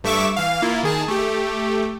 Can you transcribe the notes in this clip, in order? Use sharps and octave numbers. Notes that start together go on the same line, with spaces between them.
G2 A3 E5 C#6 D6 E7
E3 F5
A#3 E4 F4
D#3 G#4 A5
A3 G4